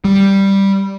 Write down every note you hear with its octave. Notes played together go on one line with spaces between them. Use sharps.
G3